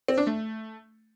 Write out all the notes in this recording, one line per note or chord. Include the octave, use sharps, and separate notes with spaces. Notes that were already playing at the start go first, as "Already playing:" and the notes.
C4
D4
A3